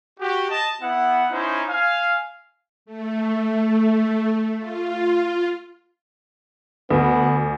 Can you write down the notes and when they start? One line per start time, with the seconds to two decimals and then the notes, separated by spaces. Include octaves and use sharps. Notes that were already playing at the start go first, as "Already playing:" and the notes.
0.20 F#4 G4
0.50 D#5 A5
0.81 B3 E4 F#5
1.30 C#4 D#4 E4 C5
1.69 F5 G#5
2.86 A3
4.59 F4
6.91 D2 B3